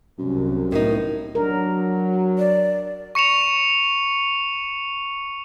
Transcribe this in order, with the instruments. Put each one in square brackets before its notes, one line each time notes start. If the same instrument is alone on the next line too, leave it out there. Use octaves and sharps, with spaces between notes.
[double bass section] C2 [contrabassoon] F#2
[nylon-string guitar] A2 B3 D#4 [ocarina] A#4
[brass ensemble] F#3 [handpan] D4 A#4
[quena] D5
[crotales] C#6 C#7 E7 F7